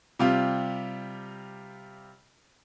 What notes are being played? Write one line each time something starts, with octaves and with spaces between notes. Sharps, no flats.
C3 G3 F4